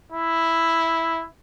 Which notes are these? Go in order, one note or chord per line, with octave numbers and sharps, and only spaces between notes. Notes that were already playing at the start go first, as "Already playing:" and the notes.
E4